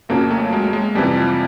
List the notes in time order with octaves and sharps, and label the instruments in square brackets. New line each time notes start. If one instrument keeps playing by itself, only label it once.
[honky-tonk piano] F#1 F2 C#3 F#3 [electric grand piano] A#3
[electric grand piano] A3
G#3
G#3
[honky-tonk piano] F2 C3 E3 [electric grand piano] G3
[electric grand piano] F3